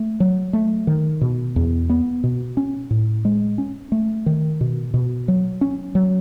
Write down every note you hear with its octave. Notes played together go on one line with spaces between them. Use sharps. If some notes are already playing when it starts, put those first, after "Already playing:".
Already playing: A3
F#3
A3
D#3
B2
E2
B3
B2
C#4
A2
G#3
C#4
A3
D#3
B2
B2
F#3
C#4
F#3